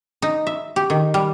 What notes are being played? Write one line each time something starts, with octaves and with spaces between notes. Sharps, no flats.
D#4
E5
G4
D#3
G3